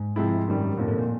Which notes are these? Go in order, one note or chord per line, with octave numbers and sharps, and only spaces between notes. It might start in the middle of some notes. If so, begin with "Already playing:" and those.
Already playing: G#2
C3 F3 G#3 C4 E4
F#2 D#3 G3
F2 A2 D3 F3 A#3
A2
A#2